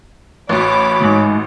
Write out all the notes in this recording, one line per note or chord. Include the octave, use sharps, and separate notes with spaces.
A1 F#4 C#5 B5 D6
D#2 G#2